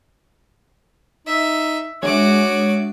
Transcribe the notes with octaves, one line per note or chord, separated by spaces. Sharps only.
D#4 E5
G#3 D4 F#4 C#5 E5 D6